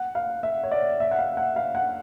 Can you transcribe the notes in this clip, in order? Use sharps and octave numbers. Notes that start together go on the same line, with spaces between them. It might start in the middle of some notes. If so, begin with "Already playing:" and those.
Already playing: F#5
F5
E5
C#5
D5
E5
F#5
F5
F#5
F5
F#5